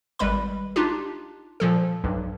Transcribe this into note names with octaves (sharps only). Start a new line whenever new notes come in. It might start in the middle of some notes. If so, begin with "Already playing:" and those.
G#1 G3 G#3 B4 B5
D4 D#4 F4 G4
A#2 F3 A4
B1 G2